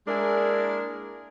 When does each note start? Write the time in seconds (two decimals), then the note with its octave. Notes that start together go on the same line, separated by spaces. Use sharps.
0.08 G#3 A#3 D4 E4 G#4 A#4